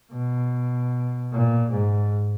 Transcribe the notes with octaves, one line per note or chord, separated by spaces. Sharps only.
B2
A#2
G#2